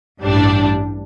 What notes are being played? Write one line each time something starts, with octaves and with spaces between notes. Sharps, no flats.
A1 G2 G3 D4